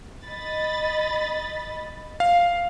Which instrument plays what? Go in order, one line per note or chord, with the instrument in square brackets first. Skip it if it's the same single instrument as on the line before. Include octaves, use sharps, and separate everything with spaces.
[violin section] D#5 B5 A6
[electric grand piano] F5